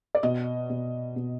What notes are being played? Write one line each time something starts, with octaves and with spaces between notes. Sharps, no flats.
D5
B2 D#5
B2
B2